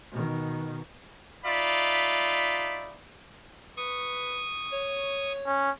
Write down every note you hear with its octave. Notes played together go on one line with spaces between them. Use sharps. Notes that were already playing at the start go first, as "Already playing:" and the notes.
B2 D#3
D#4 F4 D5 E5 B5
B4 C#6 D#6
C#5
C#4